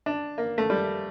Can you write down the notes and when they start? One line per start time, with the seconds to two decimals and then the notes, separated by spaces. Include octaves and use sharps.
0.06 D4
0.38 A#3
0.58 A3
0.70 G3